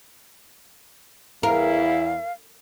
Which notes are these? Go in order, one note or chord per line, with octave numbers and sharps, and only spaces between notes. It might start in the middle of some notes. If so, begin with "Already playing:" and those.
E2 E4 A#4 F5